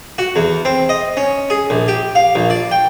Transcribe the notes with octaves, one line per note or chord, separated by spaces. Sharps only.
F#4
E2
C4
D#5
C#4
G#4
A#1
G4
F5
A#1
D5
G5